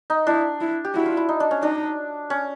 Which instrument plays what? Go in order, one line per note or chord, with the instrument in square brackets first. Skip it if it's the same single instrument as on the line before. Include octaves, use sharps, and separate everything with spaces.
[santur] D#4
[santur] D4 [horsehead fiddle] E4
[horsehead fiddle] E4
[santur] G4
[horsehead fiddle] E4 [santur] F#4
[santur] F4
E4
D#4
D4
C#4
[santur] D4 [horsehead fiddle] D#4
[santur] C#4